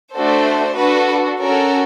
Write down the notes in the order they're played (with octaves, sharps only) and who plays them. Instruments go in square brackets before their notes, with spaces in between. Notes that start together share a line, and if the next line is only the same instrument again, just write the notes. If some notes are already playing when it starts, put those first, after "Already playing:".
[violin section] A3 D4 F#4 A4 C5
D4 F#4 A4 B4
C#4 F#4 A4 A#4